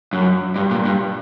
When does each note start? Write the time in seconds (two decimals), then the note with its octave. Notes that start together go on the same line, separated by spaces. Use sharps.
0.13 F#2
0.56 G2
0.71 A#2
0.85 G2